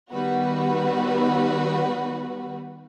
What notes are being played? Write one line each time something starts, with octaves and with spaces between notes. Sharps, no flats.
D#3 G3 B3 F#4 B4